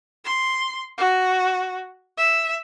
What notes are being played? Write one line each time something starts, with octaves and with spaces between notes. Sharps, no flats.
C6
F#4
E5